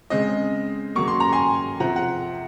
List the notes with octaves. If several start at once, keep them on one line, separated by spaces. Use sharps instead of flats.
C#3 G#3 C4 D#5
C#3 F#3 A#3 C#6
C6
A#5
G#5 C6
C3 F3 C4 F#5 A#5
F#5